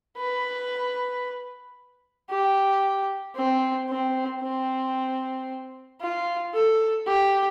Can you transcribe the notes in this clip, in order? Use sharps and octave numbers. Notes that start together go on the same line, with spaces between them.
B4
G4
C4
C4
C4
F4
A4
G4